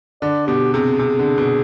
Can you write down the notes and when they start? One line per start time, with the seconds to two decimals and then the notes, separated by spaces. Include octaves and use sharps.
0.22 D3 D5
0.47 B2 G4
0.74 C3 G#4
0.99 C3
1.19 D3
1.38 B2